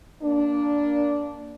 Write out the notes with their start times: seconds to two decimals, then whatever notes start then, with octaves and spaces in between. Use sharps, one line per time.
0.22 A#3 D4